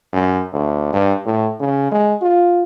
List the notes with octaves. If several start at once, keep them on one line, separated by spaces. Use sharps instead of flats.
F#2
D2
G2
A2
C#3
G#3
F4